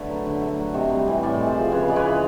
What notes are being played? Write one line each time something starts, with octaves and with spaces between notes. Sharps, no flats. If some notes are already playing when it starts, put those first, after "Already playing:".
Already playing: D3 A3 B4 C#5
F#3
D3
A3
F#3
C3 C#5 D#5
G3
E3
A2 D5 E5
G#3
C5 D5
F3
C#3 B4 C#5
G#3 D5
B4 C#5
E3